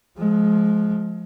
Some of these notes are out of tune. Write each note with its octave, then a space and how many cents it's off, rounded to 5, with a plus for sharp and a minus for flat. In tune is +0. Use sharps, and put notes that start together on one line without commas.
F3 +0 G#3 +25